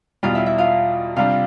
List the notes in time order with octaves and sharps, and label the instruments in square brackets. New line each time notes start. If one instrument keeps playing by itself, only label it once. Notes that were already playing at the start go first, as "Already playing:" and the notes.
[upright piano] E2 B2 G3 [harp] F4 F5
[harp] E4 E5
E4 E5
F4 F5
[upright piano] C3 G3 D4 [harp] F4 F5